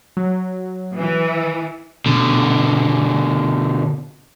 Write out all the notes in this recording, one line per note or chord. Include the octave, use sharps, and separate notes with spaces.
F#3
E3
B2 D3